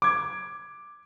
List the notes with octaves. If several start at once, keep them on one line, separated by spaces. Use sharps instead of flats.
D6 G#6